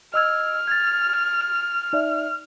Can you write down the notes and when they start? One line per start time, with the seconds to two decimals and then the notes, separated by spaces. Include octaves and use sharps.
0.14 D#5 E6 F6 G#6
0.67 G#6 A6
1.93 D#4 D5 E5